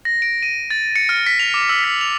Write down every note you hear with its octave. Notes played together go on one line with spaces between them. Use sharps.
A#6
D7
D#7
A6
C#7
F6
B6
F7
D6
E6
B6
F7